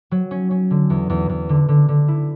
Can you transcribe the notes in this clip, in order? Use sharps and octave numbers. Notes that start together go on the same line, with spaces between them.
F#3
C#4
C#4
D3
E2
E2
E2
D3
D3
D3
E4